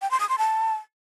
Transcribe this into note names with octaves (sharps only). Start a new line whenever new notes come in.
G5
C6
D#6
C6
A5